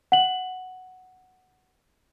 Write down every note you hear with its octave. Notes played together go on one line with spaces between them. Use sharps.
F#5 F#7